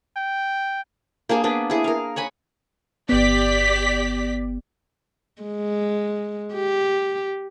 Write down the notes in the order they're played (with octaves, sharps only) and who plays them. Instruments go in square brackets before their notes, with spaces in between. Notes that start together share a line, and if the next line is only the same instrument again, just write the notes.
[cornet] G5
[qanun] A#3 D4 G#4 G#5
A#3 B3 D4
E4 G#4
A#4 F5
C#5 F#5 G#5 B5
[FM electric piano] G1 B3 [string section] G4 D5 B6
[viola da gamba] G#3
G4